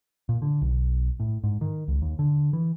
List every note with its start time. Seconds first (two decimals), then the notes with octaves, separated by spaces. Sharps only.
0.29 A#2
0.42 D3
0.62 B1
1.20 A2
1.44 G#2
1.61 D#3
1.88 C#2
2.02 D#2
2.19 D3
2.53 E3